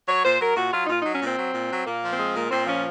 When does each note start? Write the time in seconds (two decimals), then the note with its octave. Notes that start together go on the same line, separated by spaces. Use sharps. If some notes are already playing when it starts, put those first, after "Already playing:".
0.08 F#3 C#5
0.24 A#2 C5
0.40 F#3 A#4
0.56 A#2 F#4
0.73 F#3 F4
0.83 D#4
0.89 A#2 F4
1.01 F#3 D#4
1.13 C#4
1.21 A#2 C4
1.38 F#3
1.54 A#2
1.70 F#3
1.86 A#2 A#3
2.03 F3
2.11 C4
2.19 G#3
2.35 A#2 A#3
2.51 A#2 C4
2.67 F3 C#4